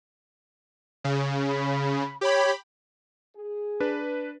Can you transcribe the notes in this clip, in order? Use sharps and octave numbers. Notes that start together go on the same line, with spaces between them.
C#3
B5
G4 C#5 B5
G#4
D4 B4